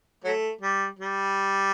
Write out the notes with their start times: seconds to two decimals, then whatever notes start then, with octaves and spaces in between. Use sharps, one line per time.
0.24 F#3 A3
0.61 G3
0.99 G3